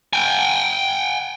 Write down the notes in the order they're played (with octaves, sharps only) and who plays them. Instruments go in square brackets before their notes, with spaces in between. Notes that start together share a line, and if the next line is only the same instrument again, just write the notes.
[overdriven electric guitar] G5 G#5